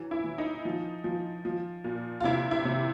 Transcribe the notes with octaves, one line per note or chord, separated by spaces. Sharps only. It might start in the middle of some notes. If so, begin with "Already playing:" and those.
Already playing: E3 F#3
E4
E3
D#4
F3
F3
F3
A#2
F4
C3 E4
E4
C3